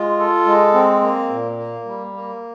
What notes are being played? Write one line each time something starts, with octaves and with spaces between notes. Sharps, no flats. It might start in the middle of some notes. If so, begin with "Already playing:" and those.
Already playing: G#3 F4
A4
G#3
C4
A#3
A#2
A#3
G3
A#3